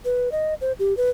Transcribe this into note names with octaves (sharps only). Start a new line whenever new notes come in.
B4
D#5
C5
G4
B4